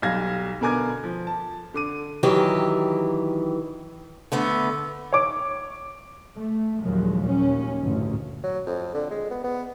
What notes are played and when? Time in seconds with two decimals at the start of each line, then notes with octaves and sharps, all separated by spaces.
0.02 B1 G3 F5 G#6 A#6
0.61 B2 D3 A#4 G#5 D6 G#6
1.04 F3
1.27 A5
1.74 D3 D6 D#7
2.23 D#3 E3 F#3 G4
4.32 D3 A3 B3
5.13 C#5 D6
6.37 A3
6.83 A#1 D#2 A#2 F3 F#3 G#3
7.26 D#2 C#4
7.82 A1 D2 G2 A#2
8.43 F#3
8.67 F2
8.94 D3
9.11 G#3
9.30 B3
9.44 B3